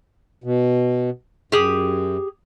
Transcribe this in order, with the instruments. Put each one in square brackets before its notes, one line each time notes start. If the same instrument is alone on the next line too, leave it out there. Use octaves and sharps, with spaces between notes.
[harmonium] B2
[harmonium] F#2 [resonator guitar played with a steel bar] G4 G#4